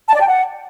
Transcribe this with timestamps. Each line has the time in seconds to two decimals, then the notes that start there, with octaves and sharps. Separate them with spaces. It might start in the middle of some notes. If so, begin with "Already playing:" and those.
0.09 A5
0.15 D5
0.21 G5
0.27 F#5